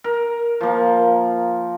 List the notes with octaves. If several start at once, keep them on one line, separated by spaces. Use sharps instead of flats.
A#4
F3 A#3